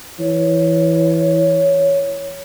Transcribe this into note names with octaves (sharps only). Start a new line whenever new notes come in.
E3 C#5